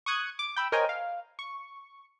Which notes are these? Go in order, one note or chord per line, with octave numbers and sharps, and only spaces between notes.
C#6 D#6 F#6 G#6 C#7
D6
G5 B5 E6
A#4 C5 C#5 D#5 G5 G#5
F5
C#6